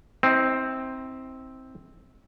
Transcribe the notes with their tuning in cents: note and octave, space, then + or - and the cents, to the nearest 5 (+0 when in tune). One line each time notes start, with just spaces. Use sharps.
C4 +0 E4 -45 D#5 +0